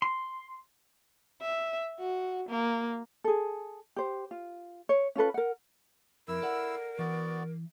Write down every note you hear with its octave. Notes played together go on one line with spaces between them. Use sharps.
C6
E5
F#4
A#3
G#4 A4
G4 C5
F4
C#5
C#4 F4 A4 B4
A#4 F#5
F2 E4 A#4 E6
A4 D5 F#5
E3 B3 F#4 D5